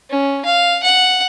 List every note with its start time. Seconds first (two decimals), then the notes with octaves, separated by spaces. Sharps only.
0.10 C#4
0.45 F5
0.83 F#5